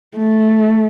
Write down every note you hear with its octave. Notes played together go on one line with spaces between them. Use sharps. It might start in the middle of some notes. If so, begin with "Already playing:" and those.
A3